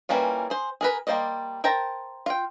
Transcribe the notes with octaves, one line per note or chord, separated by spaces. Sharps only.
E3 G3 A#3 C#4 F4
G#4 C5
G#4 A#4 B4
G3 A#3 C5 D5 D#5
A#4 C5 G5 A5 A#5
F4 G5